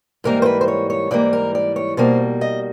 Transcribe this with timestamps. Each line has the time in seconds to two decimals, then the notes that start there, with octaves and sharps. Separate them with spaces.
0.24 G#2 E3 G3 A#3 A#4
0.42 C5
0.46 B4
0.61 C5
0.68 C#5
0.90 C#5
1.11 G#2 E3 G3 A#3 D5
1.33 A#4
1.55 D5
1.76 C#5
1.97 B2 G3 A#3 C5
2.41 D#5